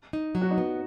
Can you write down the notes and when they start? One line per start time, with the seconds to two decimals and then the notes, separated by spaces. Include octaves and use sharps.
0.13 D#4
0.35 F#3
0.41 F#4
0.51 D#4
0.58 B3